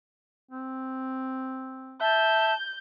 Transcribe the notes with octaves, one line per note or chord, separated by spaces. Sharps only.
C4
E5 A5 G6